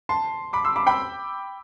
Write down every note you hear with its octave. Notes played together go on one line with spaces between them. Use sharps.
A5 C6
B5 D6
C6 E6
B5 D6
G5 B5